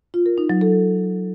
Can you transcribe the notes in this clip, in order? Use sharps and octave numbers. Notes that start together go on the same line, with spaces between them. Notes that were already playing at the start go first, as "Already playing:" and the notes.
F4
A#4
D#4
F#3
A4